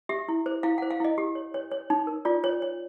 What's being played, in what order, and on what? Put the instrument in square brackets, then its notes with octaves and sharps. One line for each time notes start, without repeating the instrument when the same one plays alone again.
[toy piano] G4 E5
E4
C5
E4 F5
C5 F#5
F5
E4 D#5
G4
C#5
C#5
C#5
D#4
A#4
F4 D5
C#5
C#5